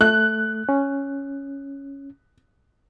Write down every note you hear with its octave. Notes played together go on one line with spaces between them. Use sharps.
A3 F#6
C#4